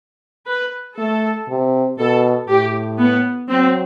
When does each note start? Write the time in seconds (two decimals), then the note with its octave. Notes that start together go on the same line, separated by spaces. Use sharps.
0.48 B4
0.98 A3 A4
1.49 C3
1.99 B2 A4
2.49 A2 G4
2.98 B3
3.49 F#3 C4